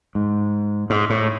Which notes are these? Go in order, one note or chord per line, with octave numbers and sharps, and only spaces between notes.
G#2
G#2
A2